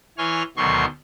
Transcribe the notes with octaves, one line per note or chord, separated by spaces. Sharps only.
E3 C#5 G#5 C6 F6
D2 B2 D#3 F#3 C6 C#6